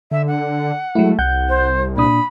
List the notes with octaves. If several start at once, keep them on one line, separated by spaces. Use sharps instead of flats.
D3 E5
F#5
F#3 G#3 A3 E4
C2 F#5 G6
C5
A#2 D4 B5 D#6